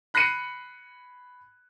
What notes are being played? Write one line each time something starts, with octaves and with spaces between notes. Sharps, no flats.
B5 F#6 A#6 C7 C#7 D#7